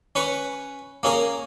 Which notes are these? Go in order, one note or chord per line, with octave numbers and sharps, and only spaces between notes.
C#4 B4 C#6
A#3 C#4 G#4 A#4